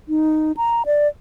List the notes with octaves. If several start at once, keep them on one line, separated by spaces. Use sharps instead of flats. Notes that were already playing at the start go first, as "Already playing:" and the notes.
D#4
A#5
D5